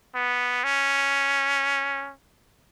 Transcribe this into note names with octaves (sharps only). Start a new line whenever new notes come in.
B3
C#4